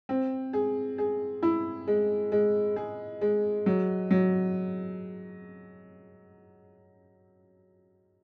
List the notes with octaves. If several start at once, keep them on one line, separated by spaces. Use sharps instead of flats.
C4
G#4
G#4
E4
G#3
G#3
G#4
G#3
F#3
F#3